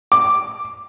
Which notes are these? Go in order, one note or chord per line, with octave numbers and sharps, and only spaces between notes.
D6